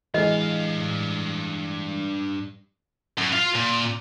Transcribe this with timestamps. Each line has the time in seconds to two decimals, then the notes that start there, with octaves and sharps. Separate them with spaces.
0.14 G2 E3 G#3 D#5 F5
3.18 F#2
3.33 F4 F5
3.56 A#2